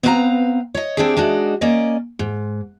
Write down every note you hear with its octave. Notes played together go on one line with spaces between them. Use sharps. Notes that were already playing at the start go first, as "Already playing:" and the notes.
B3 C4 B4 C5 F5 A#5
C#5 D#5
C4 D4 E4 G4 G#4
G#3 D4 D#4 F#4
A#3 C#4 D5 D#5
G#2